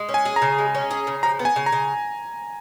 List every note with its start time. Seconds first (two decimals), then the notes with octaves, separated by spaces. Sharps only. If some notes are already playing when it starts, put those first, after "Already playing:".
Already playing: G#3
0.09 C#4
0.14 G#5
0.25 G#4
0.36 A#5
0.42 C#3
0.58 G#3
0.75 C#4
0.91 G#4
1.07 C#3
1.23 F3 A#5
1.39 B3
1.45 G#5
1.56 C#3
1.66 A#5
1.72 C#3